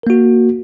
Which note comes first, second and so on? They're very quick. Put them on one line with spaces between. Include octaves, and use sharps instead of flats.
A#4 A#3 F#4